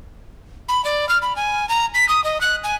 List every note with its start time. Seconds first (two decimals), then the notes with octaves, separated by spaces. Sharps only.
0.69 B5
0.85 D5
1.09 F6
1.22 B5
1.36 G#5
1.69 A#5
1.94 B6
2.09 D#6
2.24 D#5
2.41 F#6
2.64 G#5